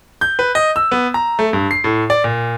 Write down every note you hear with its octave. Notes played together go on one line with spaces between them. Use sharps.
G6
B4
D#5
E6
B3
A#5
A3
G2
C7
A2
D5
A#2